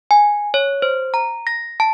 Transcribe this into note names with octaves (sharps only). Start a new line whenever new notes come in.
G#5
C#5
C5
A#5
A#6
A5